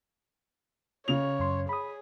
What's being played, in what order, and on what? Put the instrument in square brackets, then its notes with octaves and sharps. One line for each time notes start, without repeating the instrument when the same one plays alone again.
[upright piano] C#3 F7 [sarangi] C#5
[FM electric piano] F#2 C6
[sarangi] G#4 [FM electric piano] B5 D#6